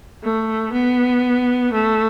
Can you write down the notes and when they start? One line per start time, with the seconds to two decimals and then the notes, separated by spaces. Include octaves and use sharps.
0.23 A3
0.73 B3
1.73 A3